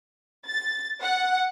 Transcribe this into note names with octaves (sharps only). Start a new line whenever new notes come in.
A6
F#5